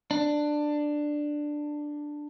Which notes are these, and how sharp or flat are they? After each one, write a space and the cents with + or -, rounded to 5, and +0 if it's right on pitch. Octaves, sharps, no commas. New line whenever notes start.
D4 +10